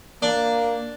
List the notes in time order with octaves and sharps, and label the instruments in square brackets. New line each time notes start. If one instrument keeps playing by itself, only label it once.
[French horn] A#3 [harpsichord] D4